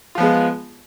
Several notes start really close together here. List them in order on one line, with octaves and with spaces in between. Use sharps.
F4 F3 B3 G#3